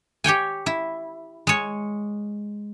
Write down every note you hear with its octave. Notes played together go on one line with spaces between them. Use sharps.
G4 C#5 G5 G#5
E4
G#3 C#5